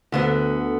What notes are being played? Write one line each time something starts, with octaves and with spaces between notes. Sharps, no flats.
D2 D3 B3